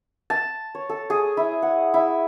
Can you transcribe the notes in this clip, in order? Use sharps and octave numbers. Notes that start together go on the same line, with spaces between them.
A5
C#5
A4
G#4
E4
F#5
E4